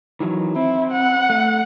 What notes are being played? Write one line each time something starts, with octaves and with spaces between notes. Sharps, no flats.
D#3 E3 F#3
C4 E4
F#5
A3